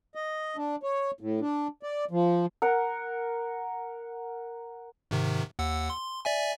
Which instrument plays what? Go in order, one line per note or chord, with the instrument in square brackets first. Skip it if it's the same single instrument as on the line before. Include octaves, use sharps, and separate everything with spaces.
[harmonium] D#5
D4
C#5
A2
D4
D5
F3
[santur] A#4 F#5
[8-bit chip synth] G#2 C3 D#3
D#2 F#5 E6
C6
D5 E5 G#5